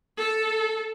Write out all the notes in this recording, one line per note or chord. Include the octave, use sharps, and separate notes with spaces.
A4